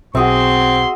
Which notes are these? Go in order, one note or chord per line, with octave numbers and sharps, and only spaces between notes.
B1 C4 F#4 G#4 E5 C6